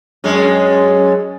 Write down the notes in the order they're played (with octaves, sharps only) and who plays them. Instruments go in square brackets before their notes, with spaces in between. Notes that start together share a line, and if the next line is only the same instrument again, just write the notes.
[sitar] F#2 G#3 C#4